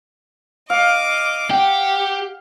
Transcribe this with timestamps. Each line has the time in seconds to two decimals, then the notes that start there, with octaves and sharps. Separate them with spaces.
0.70 D#5 F5 D6
1.51 G4 F#5